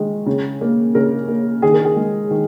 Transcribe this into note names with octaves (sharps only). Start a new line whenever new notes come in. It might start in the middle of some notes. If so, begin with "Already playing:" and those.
Already playing: D#3 G#3
C#3
A#3
C#3 A#4
A#3
D#3 G#4
A#4
G#4
G#3
D#3